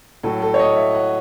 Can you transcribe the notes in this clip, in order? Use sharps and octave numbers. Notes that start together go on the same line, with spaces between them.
A2 F#3 A4
A4
C#5
D#5
E5
F#5